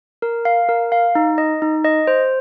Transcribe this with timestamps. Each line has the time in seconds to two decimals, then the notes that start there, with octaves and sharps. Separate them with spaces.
0.22 A#4
0.45 F5
0.69 A#4
0.92 F5
1.15 D#4
1.38 D#5
1.62 D#4
1.85 D#5
2.07 C5